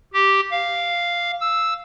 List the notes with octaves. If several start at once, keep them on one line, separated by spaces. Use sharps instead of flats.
G4
F5
E6